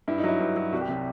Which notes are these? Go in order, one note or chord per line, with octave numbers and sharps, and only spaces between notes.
G2 E4
D#4
F#3 E4
G2
F#3
C2 F#4
G4
C3 F#3